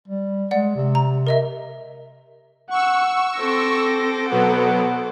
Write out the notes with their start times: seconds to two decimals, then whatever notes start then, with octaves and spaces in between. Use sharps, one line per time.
0.08 G3
0.51 G#3 D5 F#5
0.75 C3
0.95 A#5
1.27 A#4 D#5 E5
2.70 F#5 C#6 E6
3.38 C4 A4 C5 D6 A#6
4.30 B2 F#3 B3 F#5